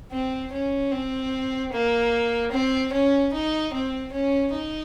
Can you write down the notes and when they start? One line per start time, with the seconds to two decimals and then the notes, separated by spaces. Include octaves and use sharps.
0.11 C4
0.52 C#4
0.91 C4
1.72 A#3
2.51 C4
2.92 C#4
3.33 D#4
3.73 C4
4.12 C#4
4.53 D#4